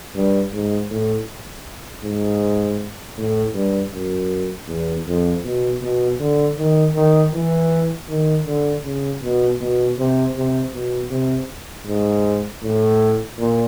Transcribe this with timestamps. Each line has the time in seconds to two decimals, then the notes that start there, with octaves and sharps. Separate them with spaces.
0.15 G2
0.52 G#2
0.90 A2
2.04 G#2
3.17 A2
3.54 G2
3.93 F#2
4.68 E2
5.07 F2
5.44 B2
5.82 B2
6.20 D3
6.58 D#3
6.95 D#3
7.34 E3
8.09 D#3
8.46 D3
8.85 C#3
9.22 B2
9.60 B2
9.98 C3
10.36 C3
10.73 B2
11.11 C3
11.86 G#2
12.63 A2
13.38 A#2